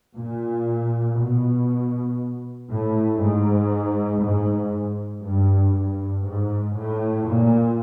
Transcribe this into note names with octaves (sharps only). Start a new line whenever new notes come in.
A#2
B2
A2
G#2
G#2
G2
G2
G#2
A2
A#2